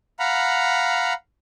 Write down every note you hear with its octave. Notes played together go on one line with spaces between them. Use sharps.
F5 F#5 A#5 B5